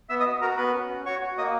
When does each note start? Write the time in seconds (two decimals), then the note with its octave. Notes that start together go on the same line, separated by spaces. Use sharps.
0.09 B3 E5 E6
0.20 D#5 D#6
0.26 F#4
0.41 F#4 A#4 A#5
0.58 B3 B4 B5
0.74 C#4
0.89 F#4
1.06 F#4 C#5 C#6
1.21 F#4
1.38 A#3 D#5 D#6